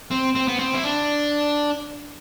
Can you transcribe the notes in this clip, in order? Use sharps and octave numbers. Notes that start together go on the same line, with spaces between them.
C4
C4
B3
C4
E4
D4